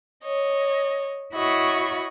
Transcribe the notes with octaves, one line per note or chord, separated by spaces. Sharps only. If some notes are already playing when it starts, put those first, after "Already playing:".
C#5 D#5
E4 F#4 C#5 D#5 B5 C#6